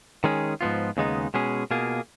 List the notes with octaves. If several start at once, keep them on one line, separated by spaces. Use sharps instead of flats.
D#3 G#3 C#4 G#4
G#2 F3 B3 F4
D#2 C#3 G#3 B3 D#4
B2 G#3 C#4 G#4
B2 A#3 F4 G#4